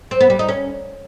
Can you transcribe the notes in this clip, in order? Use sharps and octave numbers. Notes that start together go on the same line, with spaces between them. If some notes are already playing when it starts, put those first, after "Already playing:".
C4
B3
G3
D#4
C#4